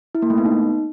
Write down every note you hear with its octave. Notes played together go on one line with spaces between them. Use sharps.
E4
A#3
A3
B3
D#4